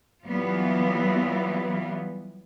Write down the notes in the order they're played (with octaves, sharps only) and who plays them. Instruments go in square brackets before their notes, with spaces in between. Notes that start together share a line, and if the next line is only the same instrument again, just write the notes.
[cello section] E3 F#3 G3 B3 F4